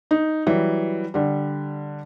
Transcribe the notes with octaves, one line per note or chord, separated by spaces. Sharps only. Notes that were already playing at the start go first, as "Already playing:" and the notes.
D#4
E3 F#3 G3
D3 G3